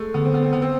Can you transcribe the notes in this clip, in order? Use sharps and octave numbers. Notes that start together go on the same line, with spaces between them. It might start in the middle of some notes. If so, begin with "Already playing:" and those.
Already playing: G#3 A3
D3 B3
C4
B3
C4
B3
C4